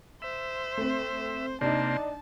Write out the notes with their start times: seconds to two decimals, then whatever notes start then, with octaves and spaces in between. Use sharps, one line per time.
0.22 C5 E5
0.77 A3 C4
1.61 C3 A#3 C4 D4 D#4 A5